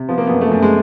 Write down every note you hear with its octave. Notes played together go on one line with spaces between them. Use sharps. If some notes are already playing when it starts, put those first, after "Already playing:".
Already playing: C3
F3 B3
A#3
F#2 B3
A3
F#2
G#3